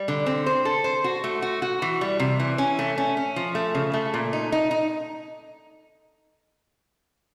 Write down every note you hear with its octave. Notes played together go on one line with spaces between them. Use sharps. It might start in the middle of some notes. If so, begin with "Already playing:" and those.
Already playing: G3
D3
C4
C5
A4
C5
F#4
A3
F#4
F#4
E3
G3
C3
E3
C#4
A3
C#4
C#4
F3
A3
C#3
A3
A#2
D#4
D#4
D#4